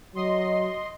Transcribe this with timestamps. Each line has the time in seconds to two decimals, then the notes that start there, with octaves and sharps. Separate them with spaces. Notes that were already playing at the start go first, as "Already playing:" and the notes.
0.15 F#3 D#5 C6